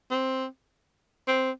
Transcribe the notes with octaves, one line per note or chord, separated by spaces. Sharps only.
C4
C4